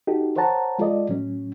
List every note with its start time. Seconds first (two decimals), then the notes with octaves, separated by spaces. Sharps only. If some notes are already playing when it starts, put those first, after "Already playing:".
0.07 D#4 F#4 G4 A4
0.36 A#4 C5 C#5 F#5 A5 A#5
0.79 G#3 F4 A4 D5 D#5
1.09 A2 F#3 C#4